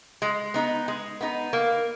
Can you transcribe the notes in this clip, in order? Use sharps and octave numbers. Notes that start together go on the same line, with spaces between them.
G#3
B3 D#4
G#3
B3 D#4
A#3